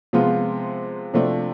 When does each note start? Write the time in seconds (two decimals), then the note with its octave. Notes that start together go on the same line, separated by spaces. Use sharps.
0.13 C3 F3 G#3 B3 F4
1.14 C3 F3 A3 D4